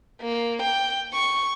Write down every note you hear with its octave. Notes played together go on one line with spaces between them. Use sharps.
A#3
G5
C#6